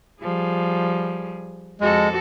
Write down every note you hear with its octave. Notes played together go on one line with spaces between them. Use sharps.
F3 G3 G#4
F2 G#3 F#4 A4